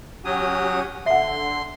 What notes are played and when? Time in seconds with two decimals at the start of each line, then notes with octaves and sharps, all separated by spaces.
0.25 F#3 C#4 F#4 G4 D#6
1.06 D3 E5 F#5 C6